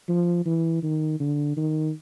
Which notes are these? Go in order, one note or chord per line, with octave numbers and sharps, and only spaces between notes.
F3
E3
D#3
D3
D#3